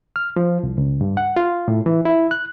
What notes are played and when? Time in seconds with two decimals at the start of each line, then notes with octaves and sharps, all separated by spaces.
0.16 F6
0.36 F3
0.63 C2
0.78 C#2
1.01 G2
1.17 F#5
1.36 F4
1.68 A2
1.86 E3
2.05 E4
2.31 F#6